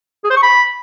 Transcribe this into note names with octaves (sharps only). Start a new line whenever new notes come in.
G#4
C5
C#6
B5